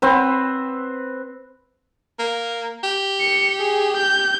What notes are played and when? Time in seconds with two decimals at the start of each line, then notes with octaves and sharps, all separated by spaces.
0.02 C4 B4
2.19 A#3
2.83 G4
3.21 C#7
3.60 G#4
3.97 G6